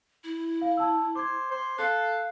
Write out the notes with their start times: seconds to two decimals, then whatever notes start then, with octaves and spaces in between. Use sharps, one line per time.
0.24 E4
0.61 F5
0.77 A5 E6
1.16 C5 D6 G#6
1.51 C5
1.78 A4 F5 F#6 C7